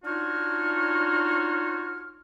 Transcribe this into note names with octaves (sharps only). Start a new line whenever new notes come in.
D4 D#4 F4 F#4 C#5 F6